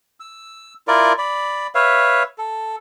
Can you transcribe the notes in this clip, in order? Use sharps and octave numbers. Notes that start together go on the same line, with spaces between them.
E6
E4 F4 A#4 D5
D5 B5
B4 C#5 E5 F5
A4